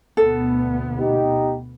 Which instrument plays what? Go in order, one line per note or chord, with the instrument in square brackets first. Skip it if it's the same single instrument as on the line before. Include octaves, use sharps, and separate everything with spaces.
[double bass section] D2 B2 B3 [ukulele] A4
[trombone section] D#4 G4